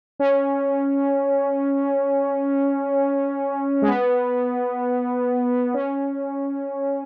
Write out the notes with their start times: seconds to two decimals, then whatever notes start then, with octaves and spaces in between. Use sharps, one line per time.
0.19 C#4
3.82 G#3
3.88 B3
5.74 C#4